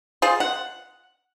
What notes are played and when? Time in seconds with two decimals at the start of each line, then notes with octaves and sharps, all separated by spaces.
0.22 F4 G#4 C5
0.40 F#5